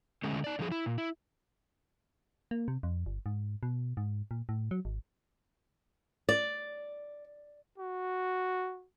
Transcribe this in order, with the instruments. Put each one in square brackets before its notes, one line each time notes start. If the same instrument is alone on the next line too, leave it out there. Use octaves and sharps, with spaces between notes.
[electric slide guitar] D3 G#3 A3 C#4
D#4 D5
D3 F3 G#4
E4
A#2
E4
[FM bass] A#3
C3
F2
G1
G#2
B2
G#2
A#2
A2
F#3
G#1
[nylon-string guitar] D5
[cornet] F#4